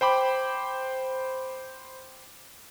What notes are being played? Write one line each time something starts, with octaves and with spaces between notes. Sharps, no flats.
C5 G5 B5 D6